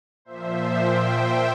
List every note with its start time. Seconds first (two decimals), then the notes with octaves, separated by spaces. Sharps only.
0.25 A#2 F3 C5 E5
0.78 E5 G5